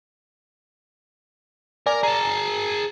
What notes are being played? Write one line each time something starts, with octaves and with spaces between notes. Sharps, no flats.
A#4 D5 G#5
G#4 A5 A#5